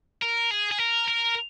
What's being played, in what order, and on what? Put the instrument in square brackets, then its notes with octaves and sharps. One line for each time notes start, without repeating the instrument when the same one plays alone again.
[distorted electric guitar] A#4
G#4
G#4
A#4
A#4